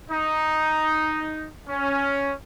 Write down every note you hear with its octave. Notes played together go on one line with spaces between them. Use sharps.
D#4
C#4